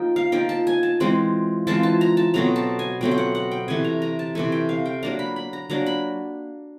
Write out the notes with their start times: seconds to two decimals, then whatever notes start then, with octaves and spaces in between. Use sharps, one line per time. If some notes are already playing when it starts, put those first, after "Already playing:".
Already playing: F3 A#3 D#4 G5
0.16 F5
0.32 F3 A#3 D#4 G5
0.49 A5
0.67 G#5
0.83 A5
1.00 E3 G#3 C4 F4
1.67 E3 G#3 C4 F4 A5
1.83 A5
2.01 A#5
2.17 A5
2.34 B2 F#3 A3 C4 A#5
2.56 A5
2.79 G#5
3.01 B2 F#3 A3 C4 G5
3.11 G5
3.18 F#5
3.35 F#5
3.51 G5
3.68 C3 E3 A3 G#5
3.84 A#5
4.02 A#5
4.19 A5
4.35 C3 E3 A3 G#5
4.52 G5
4.69 F5
4.86 G5
5.03 F#3 A#3 D4 A#5
5.19 B5
5.36 B5
5.53 A#5
5.70 F#3 A#3 D4 A#5
5.86 B5